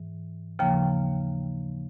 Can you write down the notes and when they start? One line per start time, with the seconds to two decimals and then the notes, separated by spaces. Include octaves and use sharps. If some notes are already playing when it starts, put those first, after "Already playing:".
Already playing: G#2 E3
0.59 D#2 C#3 F3 A#3 G5